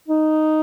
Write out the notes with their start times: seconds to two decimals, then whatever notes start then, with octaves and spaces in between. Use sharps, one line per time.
0.08 D#4